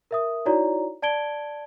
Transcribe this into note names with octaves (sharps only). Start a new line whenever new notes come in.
A#4 E5 D#6
D#4 E4 F#4 C#5 D5 A#5
D5 A5 G#6 D7 G7